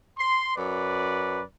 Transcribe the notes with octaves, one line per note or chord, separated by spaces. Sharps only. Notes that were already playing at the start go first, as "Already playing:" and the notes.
C6
F#2 B4 D5